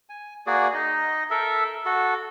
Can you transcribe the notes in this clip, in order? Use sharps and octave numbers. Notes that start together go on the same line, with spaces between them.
G#5
A#3 F#4 G#4 D5
D#4 D#5
A4 A#4 E5
F#4 A4